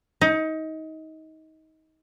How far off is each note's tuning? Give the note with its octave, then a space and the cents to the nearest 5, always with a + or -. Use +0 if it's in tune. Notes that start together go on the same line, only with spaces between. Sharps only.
D#4 +25